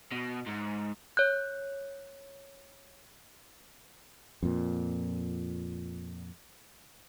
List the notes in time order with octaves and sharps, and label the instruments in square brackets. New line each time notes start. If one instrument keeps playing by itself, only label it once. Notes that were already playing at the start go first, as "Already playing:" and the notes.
[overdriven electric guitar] B2
G#2
[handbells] C#5 G6 [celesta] F#6
[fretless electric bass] F2 A#2